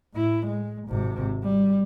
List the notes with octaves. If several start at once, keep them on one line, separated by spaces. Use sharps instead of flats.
A2 E4
G#3
G#1 C3
G3